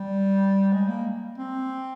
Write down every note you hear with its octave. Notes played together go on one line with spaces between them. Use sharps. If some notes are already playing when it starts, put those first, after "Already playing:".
Already playing: G3
G#3
A#3
C4